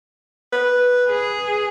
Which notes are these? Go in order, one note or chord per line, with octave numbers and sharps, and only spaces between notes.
B4
G#4